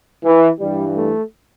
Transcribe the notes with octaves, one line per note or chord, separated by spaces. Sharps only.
E3
G2 E3 G3
A3